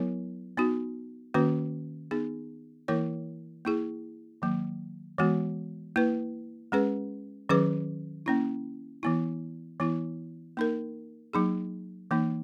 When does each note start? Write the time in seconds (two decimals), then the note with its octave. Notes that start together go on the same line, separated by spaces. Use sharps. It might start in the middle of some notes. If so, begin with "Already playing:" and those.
Already playing: F#3 B3 E4 A#4 C#5
0.57 B3 D#4 F#4
1.34 D#3 A#3 C#4 F#4 B4
2.11 B3 D#4 G#4
2.88 E3 A#3 E4 A#4 C#5
3.65 A#3 E4 G#4
4.42 D#3 F#3 A#3
5.18 E3 G#3 B3 F#4
5.96 A#3 E4 B4
6.72 G#3 C#4 G#4 B4
7.49 D#3 F#3 C#4 G#4 B4
8.26 A#3 C#4 E4
9.03 E3 B3 E4
9.80 E3 B3 E4
10.57 A#3 D#4 A#4
11.33 F#3 A#3 D#4 G#4
12.11 E3 A#3 D#4